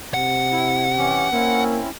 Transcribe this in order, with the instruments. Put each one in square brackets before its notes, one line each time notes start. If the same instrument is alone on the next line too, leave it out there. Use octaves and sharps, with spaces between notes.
[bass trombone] C3 [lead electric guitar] F#5
[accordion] E4
E3 C#4 G4
[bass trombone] A#3 [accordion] C4 C#4 E4